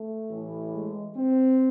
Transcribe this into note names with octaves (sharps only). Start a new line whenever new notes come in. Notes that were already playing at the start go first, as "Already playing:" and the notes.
Already playing: A3
A1 A2 E3
G#3
C4